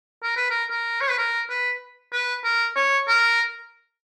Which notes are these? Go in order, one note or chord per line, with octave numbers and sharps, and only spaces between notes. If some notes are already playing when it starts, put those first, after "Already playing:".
A#4
B4
A#4
A#4
C#5
B4
A#4
B4
B4
A#4
C#5
A#4